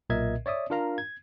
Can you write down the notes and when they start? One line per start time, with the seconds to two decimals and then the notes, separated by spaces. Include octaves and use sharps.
0.10 B1 A#2 A#4 D#5 E5 G#6
0.46 C#5 D5 E5 D#6
0.70 D4 F4 A#4 F5 A#5
0.98 G#6